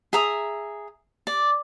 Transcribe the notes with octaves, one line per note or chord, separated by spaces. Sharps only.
G#4 E5 A#5 D#6
D5